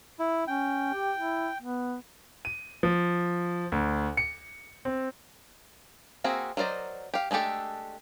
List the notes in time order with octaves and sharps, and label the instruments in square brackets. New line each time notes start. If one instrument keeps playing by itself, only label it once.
[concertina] E4
[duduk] C#4 [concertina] G5
[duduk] G4
E4
B3
[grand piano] D#7
F3
D2
C#7
C4
[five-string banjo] A#3 C4 F#4 G#4 E5
F#3 A#4 C5 D5 D#5
G4 F5
G#3 A3 D4 G4 A4